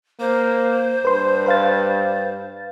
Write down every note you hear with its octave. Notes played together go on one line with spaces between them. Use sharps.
A#3 C5
G2 B4 C6
B4 F5 A6